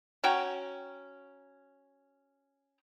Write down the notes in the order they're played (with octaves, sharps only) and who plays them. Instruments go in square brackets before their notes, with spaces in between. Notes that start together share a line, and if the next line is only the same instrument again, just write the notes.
[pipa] C#4 F#4 G5 A#5